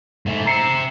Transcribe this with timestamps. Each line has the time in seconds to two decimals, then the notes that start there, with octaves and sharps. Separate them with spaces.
0.26 G#2 A3
0.46 C4 E5 A#5 C7 C#7